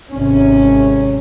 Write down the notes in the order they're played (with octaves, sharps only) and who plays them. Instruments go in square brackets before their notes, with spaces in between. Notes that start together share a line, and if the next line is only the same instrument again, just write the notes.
[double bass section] G#1 C3 C#4